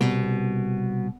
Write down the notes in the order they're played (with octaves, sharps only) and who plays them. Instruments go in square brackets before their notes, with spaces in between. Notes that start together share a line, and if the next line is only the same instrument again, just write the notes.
[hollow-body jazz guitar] C2 [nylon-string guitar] B2